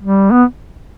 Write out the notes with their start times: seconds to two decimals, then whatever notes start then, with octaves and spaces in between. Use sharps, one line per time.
0.02 G3
0.31 B3